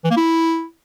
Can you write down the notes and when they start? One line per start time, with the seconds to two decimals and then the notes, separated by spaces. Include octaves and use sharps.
0.04 E3
0.10 A#3
0.17 E4